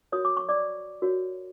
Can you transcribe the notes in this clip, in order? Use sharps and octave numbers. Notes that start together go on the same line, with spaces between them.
F#4 A#4 C#5 D#6
D6
C#6
D5 D6
F#4 A#4 C#5